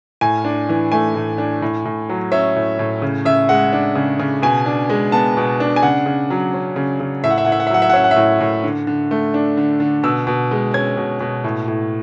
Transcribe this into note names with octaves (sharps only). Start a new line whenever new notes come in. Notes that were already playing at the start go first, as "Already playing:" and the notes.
A2 G#5
D4
E3
A3 G#5
A2
D4
A2
A2
F#3
C#4 E5
A2
A2
C#3
C#3 E5
G#3 F#5
D4
C#3
C#3
B2 G#5
D4
G#3
B3 A5
B2
D4
G#5
C#3 F#5
C#3
F#3
C#4
C#3
C#3
A2 E5
F#5
E5
A2 F#5
E5
F#5
E5
F#3 F#5
E5
F#5
C#4 E5
F#5
E5
A2
A2
D3
D3
A3
D4
D3
D3
B2 E6
B2
G#3
C#4 G#6
B2
B2
A2
A2